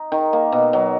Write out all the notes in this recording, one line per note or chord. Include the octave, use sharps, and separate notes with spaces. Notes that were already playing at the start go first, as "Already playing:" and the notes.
Already playing: D#4
D#3
A#3
B2
F#3